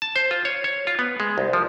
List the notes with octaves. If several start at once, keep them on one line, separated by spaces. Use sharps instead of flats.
A5
C5
F4
C#5
C#5
F4
B3
G#3
C2
F3